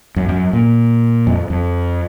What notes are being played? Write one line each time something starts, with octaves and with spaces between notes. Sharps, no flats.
F#2
F#2
A#2
F2
F2